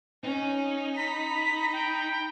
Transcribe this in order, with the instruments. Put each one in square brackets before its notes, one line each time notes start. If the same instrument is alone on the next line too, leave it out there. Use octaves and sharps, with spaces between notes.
[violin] C#4 [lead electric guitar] D#4
[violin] A#5 [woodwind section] B5 [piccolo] B6
[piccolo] G5